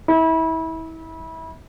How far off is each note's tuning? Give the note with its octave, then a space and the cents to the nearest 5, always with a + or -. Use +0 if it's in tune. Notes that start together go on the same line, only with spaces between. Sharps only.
E4 -30